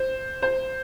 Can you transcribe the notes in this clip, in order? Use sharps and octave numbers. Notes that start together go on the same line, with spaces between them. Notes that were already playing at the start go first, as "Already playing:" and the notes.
Already playing: C5
C5